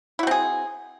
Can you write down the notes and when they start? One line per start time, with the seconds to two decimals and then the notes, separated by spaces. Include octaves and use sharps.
0.19 E4
0.23 F#4
0.27 C4
0.31 G#4